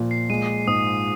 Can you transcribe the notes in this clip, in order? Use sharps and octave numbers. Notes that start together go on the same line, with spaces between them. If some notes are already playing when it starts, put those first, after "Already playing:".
Already playing: A#2 F3
C7
G#3 D#7
G#2 D#6